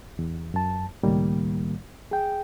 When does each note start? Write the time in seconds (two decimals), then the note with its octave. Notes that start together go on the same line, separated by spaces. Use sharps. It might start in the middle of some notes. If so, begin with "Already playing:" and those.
0.19 E2
0.54 F#2 A5
1.03 C#2 A2 D#3 G3 A#3
2.11 G#4 G5